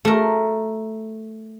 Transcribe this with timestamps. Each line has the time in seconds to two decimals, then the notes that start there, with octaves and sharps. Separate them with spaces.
0.05 A3 A#4